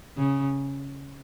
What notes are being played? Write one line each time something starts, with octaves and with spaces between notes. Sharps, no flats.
C#3